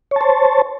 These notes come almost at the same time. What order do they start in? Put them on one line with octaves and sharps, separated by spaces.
C#5 A5 C5